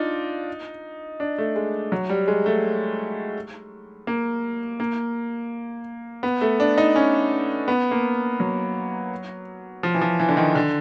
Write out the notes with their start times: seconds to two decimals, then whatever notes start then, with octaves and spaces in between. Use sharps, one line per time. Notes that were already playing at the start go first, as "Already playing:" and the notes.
Already playing: D4 D#4 F4
1.20 D4
1.38 A3
1.56 G#3
1.92 F#3
2.10 G3
2.28 G#3
2.46 A3
4.07 A#3
4.80 A#3
6.23 B3
6.41 A3
6.60 D4
6.78 D#4
6.96 C#4
7.68 B3
7.91 A#3
8.40 F#3
9.83 F3
9.94 E3
10.01 F3
10.20 E3
10.29 D3
10.37 D#3
10.55 D3